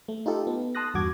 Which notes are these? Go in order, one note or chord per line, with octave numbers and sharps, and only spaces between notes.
A3
D#4 F4 G4 A4
B3
A5 C6 D#6 F#6 A#6
E2 G2 F#4 D6 G#6